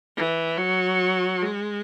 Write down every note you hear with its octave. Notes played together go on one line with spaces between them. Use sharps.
E3
F#3
G#3